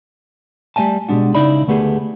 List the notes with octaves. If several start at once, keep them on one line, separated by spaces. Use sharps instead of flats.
G3 A3 D#5 G#5 A5
B2 G3 G#3 D4 F#4
C#3 D#4 E4 D5 B5
D2 A3 B3 G4 G#4